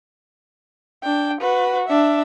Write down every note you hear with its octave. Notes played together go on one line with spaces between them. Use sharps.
D4 G5
F#4 B4
D4 E5